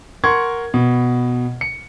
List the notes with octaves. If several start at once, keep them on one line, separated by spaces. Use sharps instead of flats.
A#4 F#5 C6 C#6 G#6
B2
C#7